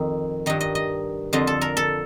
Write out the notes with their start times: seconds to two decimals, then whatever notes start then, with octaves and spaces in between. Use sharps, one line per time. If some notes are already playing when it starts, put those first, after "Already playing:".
Already playing: F2 D#3
0.46 G2 D#3 D#5
0.61 D#5
0.75 D#5
1.33 F2 D3 F3 D#5
1.47 A4
1.61 A#4
1.77 A4